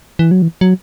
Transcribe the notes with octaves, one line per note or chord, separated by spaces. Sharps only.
E3
F#3
E3
F#3